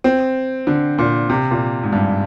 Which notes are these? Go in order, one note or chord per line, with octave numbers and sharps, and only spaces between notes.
C4
D3
A#2
C3
A#2
G#2
G2